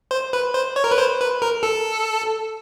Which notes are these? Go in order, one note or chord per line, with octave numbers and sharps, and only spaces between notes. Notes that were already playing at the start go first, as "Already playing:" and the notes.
C5
B4
C5
C#5
A#4
B4
C5
B4
A#4
A4